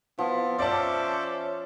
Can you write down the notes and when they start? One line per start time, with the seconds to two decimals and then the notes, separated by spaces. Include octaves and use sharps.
0.18 F3 B3 E4
0.59 C#4 C5 D5 E5 A5 D6